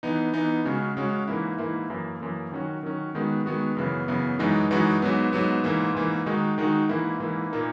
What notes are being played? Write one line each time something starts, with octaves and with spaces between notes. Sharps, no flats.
E3 B3 D#4
E3 B3 D#4
C#3 G#3 C#4 F#4
C#3 G#3 C#4 F#4
G#2 E3 A#3 E4
G#2 E3 A#3 E4
F#2 E3 A#3
F#2 E3 A#3
D#3 F#3 C#4 F#4
D#3 F#3 C#4 F#4
D#3 G#3 B3 F#4
D#3 G#3 B3 F#4
F#2 C#3 E3 B3
F#2 C#3 E3 B3
F#2 E3 G#3 D#4 F#4
F#2 E3 G#3 D#4 F#4
G#2 F#3 B3
G#2 F#3 B3
G#2 E3 A#3
G#2 E3 A#3
D#3 G#3 D#4 F#4
D#3 G#3 D#4 F#4
G#2 E3 A#3 E4
G#2 E3 A#3 E4
A#2 A#3 D#4